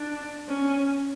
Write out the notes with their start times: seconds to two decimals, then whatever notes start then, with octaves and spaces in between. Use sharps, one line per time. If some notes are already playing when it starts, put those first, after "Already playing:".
Already playing: D4
0.49 C#4